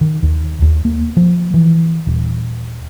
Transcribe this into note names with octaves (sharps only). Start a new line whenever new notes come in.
D#3
D#2
D#2
A#3
F3
E3
D#1